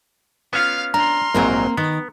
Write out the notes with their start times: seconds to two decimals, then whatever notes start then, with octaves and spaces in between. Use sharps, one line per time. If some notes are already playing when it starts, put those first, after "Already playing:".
0.53 B3 C#4 F4 F5 F6
0.94 D4 A#5 C6 F6
1.35 A#1 G#2 F#3 A#3 C4 A#4
1.77 D#3 B3